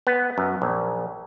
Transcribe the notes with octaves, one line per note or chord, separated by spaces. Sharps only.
B3
F#2
A#1